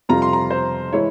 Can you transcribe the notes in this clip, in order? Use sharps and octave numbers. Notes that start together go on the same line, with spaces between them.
F2 C3 G3 C4 F4 A#5
C6
A#5
C5
E3 G#3 E4 C#5